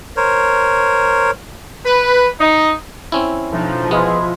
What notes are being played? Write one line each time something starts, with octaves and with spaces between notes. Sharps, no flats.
A#4 C5 C#5
B4
D#4
C4 C#4 E4
B2 F3 A3 D4 D#4
G#3 B3 E4 F4 G#4